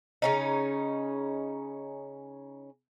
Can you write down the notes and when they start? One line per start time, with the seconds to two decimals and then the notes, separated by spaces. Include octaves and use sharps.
0.22 C#3 C#4 D#4